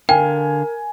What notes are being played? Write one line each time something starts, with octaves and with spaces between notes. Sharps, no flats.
D3 A#4 F5 G5 G#5